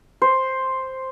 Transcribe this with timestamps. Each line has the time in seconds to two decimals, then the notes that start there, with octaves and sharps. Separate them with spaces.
0.22 C5